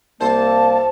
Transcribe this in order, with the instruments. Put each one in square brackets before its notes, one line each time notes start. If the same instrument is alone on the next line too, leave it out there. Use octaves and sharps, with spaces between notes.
[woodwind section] C2 A#3 [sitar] C5 [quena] A5